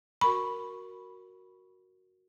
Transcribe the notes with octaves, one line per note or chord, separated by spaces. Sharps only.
F#4 A#4 B5 C#6